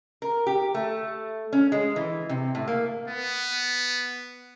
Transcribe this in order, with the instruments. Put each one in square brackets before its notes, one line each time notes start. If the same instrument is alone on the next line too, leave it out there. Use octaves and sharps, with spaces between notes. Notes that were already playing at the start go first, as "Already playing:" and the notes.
[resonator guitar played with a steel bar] A#4
G4
A3
C#4
G#3
E3
C3
A2
A#3
[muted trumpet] B3